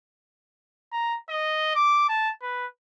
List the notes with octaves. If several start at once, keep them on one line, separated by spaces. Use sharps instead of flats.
A#5
D#5
D6
A5
B4